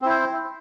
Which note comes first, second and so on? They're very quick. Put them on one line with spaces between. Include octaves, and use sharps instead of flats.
C4 E4 C5